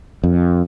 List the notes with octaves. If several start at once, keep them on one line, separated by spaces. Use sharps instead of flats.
F2